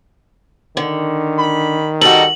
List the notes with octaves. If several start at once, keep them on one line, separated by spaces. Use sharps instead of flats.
D3 D#3
B5
G3 D#4 F#4 A4 G5 F#7